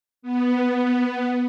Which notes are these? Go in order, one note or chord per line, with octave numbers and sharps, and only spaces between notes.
B3